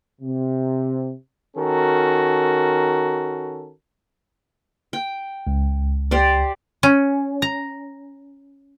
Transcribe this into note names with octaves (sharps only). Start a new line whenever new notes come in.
C3
D#3 C#4 F#4 A4 A#4
G5
C#2
G4 C5 D5
C#4
A#5